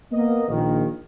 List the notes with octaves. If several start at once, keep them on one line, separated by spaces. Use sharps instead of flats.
A#3 B3 D#5
A#1 D#3